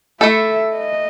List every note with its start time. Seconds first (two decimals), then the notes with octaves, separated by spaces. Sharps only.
0.21 A3 E4 A4 E5
0.77 D#5